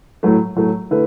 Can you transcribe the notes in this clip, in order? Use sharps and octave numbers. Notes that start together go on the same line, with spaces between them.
A2 F#3 A3
A2 F#3 A3
D3 A3 E4 B4